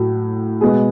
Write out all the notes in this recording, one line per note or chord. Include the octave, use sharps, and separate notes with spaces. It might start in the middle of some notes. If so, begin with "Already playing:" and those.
Already playing: A2 F#3 A3 F#4
B2 G#3 B3 G#4